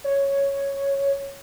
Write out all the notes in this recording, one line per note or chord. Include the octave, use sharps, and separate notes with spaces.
C#5